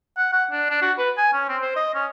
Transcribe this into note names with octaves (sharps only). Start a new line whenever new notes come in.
F#5
F#5
D4
D4
F#4
B4
G#5
C#4
C4
C5
D#5
C#4